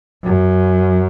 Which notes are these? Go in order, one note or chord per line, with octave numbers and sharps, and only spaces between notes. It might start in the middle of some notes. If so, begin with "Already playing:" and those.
F#2